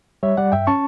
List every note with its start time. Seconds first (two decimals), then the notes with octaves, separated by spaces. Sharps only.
0.23 G3 C#5 E5
0.37 G3 D5 F#5
0.52 G2 E5 G5
0.67 C#4 A5 C#6